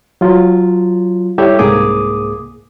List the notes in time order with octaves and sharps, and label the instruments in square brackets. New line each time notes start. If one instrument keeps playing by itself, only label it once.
[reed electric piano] F#3 F4
G3 E4 G4 A4 C#5 E5
C2 G#2 A#3 G#4 D6 D#6